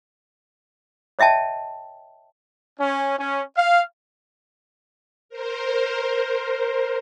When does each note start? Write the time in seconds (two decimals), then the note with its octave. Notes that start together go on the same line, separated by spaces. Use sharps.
1.19 C#5 D#5 E5 G5 A5
2.79 C#4
3.17 C#4
3.56 F5
5.29 A#4 C5